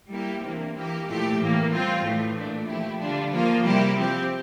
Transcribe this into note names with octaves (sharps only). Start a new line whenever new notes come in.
G3 A#3 E4 G4
C3 E3 A#3 D4
E3 A#3 E4 G4
A#2 F3 A3 E4 G4
A2 E3 A#3
G3 C4 F4
A2 E3 A3
A#2 A3 D4
F3 A3 E4 G4
D3 G3 D4 F4
F3 A#3 F4
C3 G3 A#3 E4 G4
F3 C4 G4